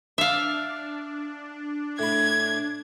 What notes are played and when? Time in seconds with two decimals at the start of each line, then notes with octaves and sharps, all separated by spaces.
0.18 D4 E5 F5
1.99 A2 B5 G#6